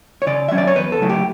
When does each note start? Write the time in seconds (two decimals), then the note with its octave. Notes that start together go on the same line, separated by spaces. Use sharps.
0.22 C#5
0.26 C#3 D5
0.48 F#3 C#4 E5
0.58 D5
0.67 C#5
0.76 E2 B4
0.92 A4
1.01 C#3 F#3 A3 E4
1.09 G4